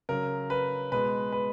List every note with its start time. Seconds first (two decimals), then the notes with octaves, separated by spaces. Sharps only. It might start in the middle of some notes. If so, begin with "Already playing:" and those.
0.09 C#3 F#3 A#4
0.50 B4
0.92 B2 G#3 B4
1.32 B4